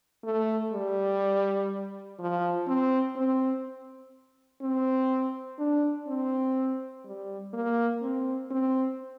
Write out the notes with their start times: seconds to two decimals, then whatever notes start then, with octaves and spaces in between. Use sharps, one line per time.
0.24 A3
0.73 G3
2.19 F3
2.67 C4
3.16 C4
4.62 C4
5.59 D4
6.07 C4
7.05 G3
7.54 A#3
8.02 C4
8.51 C4